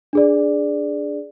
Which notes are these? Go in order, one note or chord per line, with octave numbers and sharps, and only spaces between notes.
D4 G#4 D5